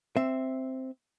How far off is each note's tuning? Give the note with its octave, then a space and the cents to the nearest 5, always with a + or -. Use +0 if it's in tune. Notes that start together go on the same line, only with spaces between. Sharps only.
C4 +0 E5 +0